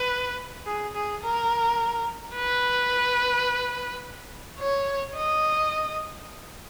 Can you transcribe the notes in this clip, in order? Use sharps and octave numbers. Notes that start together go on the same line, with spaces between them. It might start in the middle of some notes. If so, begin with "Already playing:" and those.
Already playing: B4
G#4
G#4
A#4
B4
C#5
D#5